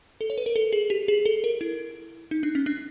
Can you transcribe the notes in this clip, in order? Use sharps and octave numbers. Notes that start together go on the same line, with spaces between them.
A4
C#5
B4
A#4
A4
G#4
G4
G#4
A4
A#4
E4
D#4
D4
C#4
D4